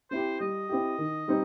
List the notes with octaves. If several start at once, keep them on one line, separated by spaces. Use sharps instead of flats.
C4 E4 G4 C5
G3 D#5
C4 E4 G4
D#3
G3 C4 D#4